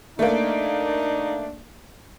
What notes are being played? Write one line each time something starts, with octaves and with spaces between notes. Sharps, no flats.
A3 A#3 D4 D#4